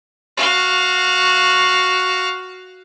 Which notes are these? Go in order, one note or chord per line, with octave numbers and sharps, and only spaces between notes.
F#4 F5